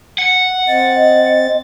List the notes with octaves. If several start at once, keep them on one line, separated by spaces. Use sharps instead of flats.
F#5
C4 D#5 A6